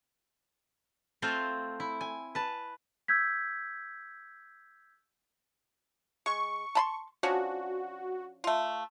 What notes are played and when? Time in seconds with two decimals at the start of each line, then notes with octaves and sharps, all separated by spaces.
1.22 A3 C4 F4 A4 C5 F5
1.80 E4
2.01 G#5
2.35 B4 A5
3.08 E6 G6 G#6 B6
6.26 G#3 C#6
6.75 A5 B5 C6
7.23 F3 C#4 D4 F#4
8.44 A3 F4